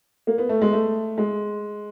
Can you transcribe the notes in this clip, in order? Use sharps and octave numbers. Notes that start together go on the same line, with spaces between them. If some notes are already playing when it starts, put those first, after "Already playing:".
A#3
B3
A3
G#3
A3
G#3